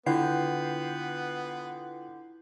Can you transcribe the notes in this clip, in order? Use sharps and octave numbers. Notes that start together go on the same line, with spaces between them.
D3 B3 E4 F4 B4 G5 G6 C7